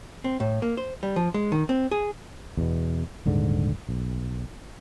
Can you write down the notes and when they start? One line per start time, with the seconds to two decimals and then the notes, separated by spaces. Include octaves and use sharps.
0.24 C4
0.40 A2
0.62 A#3
0.77 C5
1.03 G3
1.16 F3
1.34 G#3
1.52 D#3
1.69 C4
1.91 G#4
2.57 E2 B2
3.26 D#1 G#2 D3
3.89 B1